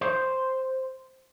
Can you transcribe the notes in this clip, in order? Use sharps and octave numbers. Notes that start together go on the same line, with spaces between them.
C5